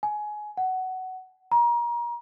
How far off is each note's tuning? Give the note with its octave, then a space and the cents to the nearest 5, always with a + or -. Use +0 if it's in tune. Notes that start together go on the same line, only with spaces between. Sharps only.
G#5 +20
F#5 +15
A#5 +30